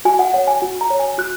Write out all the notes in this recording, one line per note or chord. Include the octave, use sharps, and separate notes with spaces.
F#4 G#5
F#5
C#5 F#5
G#5
F#4
A#5
C#5
G#5
F#4 F#6